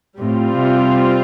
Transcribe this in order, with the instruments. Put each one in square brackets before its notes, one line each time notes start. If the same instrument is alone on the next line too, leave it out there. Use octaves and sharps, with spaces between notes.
[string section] A2 [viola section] G3 C4 F4
[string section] C3